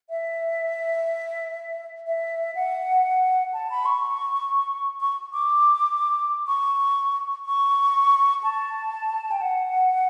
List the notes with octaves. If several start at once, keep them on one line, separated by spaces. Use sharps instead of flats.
E5
E5
F#5
A5
B5
C#6
C#6
D6
C#6
C#6
A5
G5
F#5